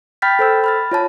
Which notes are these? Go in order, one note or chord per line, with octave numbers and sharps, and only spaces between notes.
G5 B5 F6 G6 A6 B6
A4 C5 E6
B5 F6 A6
F4 C#5 A5